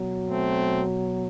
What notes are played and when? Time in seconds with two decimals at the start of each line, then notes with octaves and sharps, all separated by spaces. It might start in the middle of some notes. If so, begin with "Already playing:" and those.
Already playing: B2 F#3
0.29 A3 C4